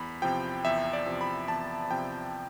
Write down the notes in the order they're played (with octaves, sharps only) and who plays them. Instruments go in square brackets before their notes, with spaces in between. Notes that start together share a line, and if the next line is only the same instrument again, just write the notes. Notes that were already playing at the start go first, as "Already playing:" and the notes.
Already playing: [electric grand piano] E2 B5
C3 F3 G5
E2 E5
D5
C3 F3
B5
E2 A5
C3 F3 G5